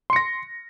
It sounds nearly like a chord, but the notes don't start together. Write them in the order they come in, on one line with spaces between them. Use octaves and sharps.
C6 C#7 A#6